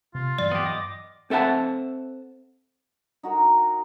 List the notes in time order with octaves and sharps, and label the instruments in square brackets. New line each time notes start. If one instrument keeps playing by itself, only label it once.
[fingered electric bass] C3 [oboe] F4
[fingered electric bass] G2 E3 F#3 [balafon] D5
[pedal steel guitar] B3 G4
D#5 D6
[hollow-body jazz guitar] C4 A4 E5 F#5 A5
[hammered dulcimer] D#4 F#4 A#4 G5